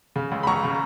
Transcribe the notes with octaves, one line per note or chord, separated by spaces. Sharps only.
C#3
C#2
B5
C#2 A#5 C#6
C#3